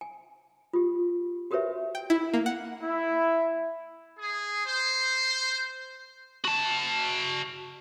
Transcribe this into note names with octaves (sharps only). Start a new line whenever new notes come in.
G#5
F4 G4
F#4 G4 A#4 B4 C#5 E5
G5
E4
A#3
F#5
E4
G#4
C5
F#4 A5